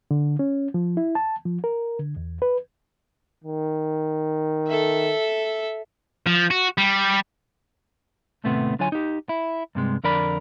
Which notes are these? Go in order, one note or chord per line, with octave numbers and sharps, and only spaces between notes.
D3
C#4
F3
E4
A5
F3
A#4
D3
E2
B4
D#3
A4 E5
F3
F#4
G3
D#2 A2 C3 A3 B3 C4
D3 F#3 F4 C#5 G#5
D#4 G4
E4
G2 C3 G#3
F2 D3 A#4 D5 B5